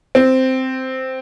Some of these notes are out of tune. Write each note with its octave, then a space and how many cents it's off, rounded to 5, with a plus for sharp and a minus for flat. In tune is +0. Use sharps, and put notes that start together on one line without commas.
C4 -5